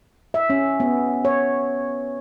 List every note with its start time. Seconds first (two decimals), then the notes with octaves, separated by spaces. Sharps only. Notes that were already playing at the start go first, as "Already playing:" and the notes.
0.34 E5
0.50 C#4
0.80 B3
1.25 C#5